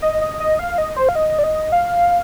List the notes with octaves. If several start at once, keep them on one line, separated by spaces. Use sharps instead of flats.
D#5
D#5
D#5
F5
D#5
C5
F5
D#5
D5
D#5
F5